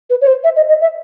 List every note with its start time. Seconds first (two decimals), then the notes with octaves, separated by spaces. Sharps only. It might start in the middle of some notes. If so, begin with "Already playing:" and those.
0.10 B4
0.21 C#5
0.27 C5
0.44 E5
0.56 D#5
0.68 D#5
0.81 E5